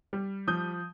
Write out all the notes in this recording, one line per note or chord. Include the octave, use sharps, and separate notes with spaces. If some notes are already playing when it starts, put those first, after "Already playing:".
G3
F3 D#6 G6